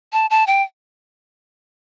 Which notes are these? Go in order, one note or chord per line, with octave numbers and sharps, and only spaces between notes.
A5
A5
G5